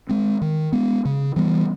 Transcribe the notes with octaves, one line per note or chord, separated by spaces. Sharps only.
G#3 C4
D#3
G#3 B3
C#3
E3 G3 B3